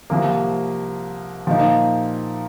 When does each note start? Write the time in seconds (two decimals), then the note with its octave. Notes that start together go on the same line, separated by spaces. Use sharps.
0.10 C2 C3 F3 A#3
1.47 A#2 F3 A#3 D#4